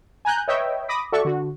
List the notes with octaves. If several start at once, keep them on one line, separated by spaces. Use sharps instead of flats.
G#5 A#5 F#6 G6
B4 C#5 D#5 E5 G5
B5 D6 D#6 A#6
F#4 A4 D5 E5 C#6
D3 F#4